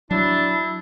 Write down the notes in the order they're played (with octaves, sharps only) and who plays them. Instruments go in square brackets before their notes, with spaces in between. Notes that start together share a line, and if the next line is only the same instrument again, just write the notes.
[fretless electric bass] F#3 [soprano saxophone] D4 [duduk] E4